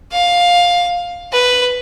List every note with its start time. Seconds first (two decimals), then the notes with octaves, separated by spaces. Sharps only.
0.12 F5
1.32 B4